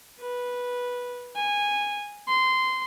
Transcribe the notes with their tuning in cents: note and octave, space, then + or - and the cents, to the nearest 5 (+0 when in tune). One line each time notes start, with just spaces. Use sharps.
B4 -10
G#5 -15
C6 -15